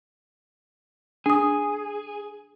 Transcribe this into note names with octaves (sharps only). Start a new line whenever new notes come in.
D4 G#4 D#6